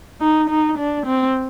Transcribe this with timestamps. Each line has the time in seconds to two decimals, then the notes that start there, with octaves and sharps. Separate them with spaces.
0.21 D#4
0.49 D#4
0.78 D4
1.06 C4